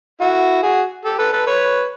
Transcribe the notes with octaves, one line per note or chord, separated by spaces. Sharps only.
E4 F#4
F#4 G#4
G4 A4
A4 B4
A4 B4
B4 C#5